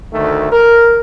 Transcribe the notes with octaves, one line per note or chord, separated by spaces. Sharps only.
D2 D#3 A3
A#4